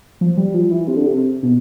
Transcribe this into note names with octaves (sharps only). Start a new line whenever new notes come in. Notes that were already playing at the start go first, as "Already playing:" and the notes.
F3
G3
F3
E3
C3
D3
C3
B2